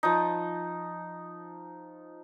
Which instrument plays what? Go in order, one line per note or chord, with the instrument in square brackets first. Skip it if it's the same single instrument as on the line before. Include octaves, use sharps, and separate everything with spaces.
[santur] F3 D#4